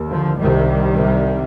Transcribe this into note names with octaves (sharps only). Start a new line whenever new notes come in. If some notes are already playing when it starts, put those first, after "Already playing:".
Already playing: D#2
D3 F3
C2 C3 D#3 G3
C2 C3